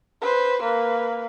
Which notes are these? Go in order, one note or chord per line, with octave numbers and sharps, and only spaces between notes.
B4 C5
A#3 B4